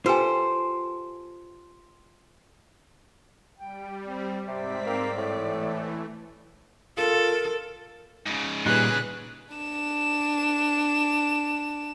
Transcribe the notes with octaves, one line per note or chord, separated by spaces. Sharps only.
F4 G4 A4 B4 C5 G#5
G3 G5
C4
G#2 C3 C4 D5 B6
A#3
A2 E3 A3
F4 A4 A#4
G#2 C#3
A#2 C#3 G3 D#4 G#4 B4 F#6
D4 E7